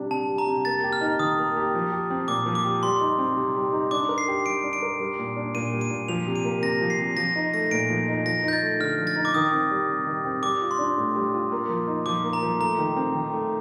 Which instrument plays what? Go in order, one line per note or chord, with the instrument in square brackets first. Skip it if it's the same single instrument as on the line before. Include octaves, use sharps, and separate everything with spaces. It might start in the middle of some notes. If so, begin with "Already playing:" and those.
Already playing: [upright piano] C3 G3 D4
[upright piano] C3 [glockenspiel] A5
[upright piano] G3
[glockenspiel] A#5
[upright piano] C3
[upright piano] A#3 [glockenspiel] A6
[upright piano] G4
[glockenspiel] F6
[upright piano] D#4
[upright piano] D#3 [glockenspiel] D#6
[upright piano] A#3
G4
F3
G4
C4
[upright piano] A#2 [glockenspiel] D6
[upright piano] F3
[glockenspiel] D6
[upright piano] G4
[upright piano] G3 [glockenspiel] C6
[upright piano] D#4
C4
C3
G3
D#4
[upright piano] D4 [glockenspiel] D6
[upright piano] A#4
[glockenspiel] C7
[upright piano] G4
[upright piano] G3 [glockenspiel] D7
[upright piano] D4
[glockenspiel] D7
[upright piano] A#4
G3
A#2
D4
[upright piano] A#2 [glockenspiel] D#7
[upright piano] G3
[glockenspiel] D#7
[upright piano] A#2
[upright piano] F3 [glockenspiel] F7
[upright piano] C3
[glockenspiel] D#7
[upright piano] A#3
[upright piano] C3 [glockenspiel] A#6
[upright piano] F3
[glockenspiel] C7
[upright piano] C3
[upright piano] F3 [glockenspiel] A#6
[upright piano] D#4
[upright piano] A3 [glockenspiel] A#6
[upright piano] A#2 [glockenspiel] D7
[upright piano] F3
D#4
[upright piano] F3 [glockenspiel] A#6
[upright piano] D#4 [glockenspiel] G6
[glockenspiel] A6
[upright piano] A3
[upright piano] D3 [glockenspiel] F6
[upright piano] F3
[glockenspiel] A6
[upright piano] D#4
[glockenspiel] D6
[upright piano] D#3 [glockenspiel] D#6
[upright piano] C4
G3
C3
D#3
C4
[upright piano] G3 [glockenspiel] D6
[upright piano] F4
[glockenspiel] C6
[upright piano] D4
A2
G3
F4
A#3
F3
D#4
[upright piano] F3 [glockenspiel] D6
[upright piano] A#3
[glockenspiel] A#5
[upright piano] F3
[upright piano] A3 [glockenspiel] A#5
[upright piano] D#3
C4
D#3
A3